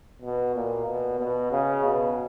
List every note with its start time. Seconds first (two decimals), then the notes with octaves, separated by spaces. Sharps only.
0.22 B2
0.55 A#2
0.87 B2
1.19 B2
1.51 C#3
1.84 B2